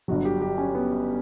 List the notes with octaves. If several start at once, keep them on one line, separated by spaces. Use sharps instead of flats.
G1 G2 F#3 F#4
G4
G4
C#4
B3